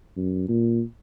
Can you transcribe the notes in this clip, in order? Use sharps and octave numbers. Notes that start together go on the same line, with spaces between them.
F#2
A#2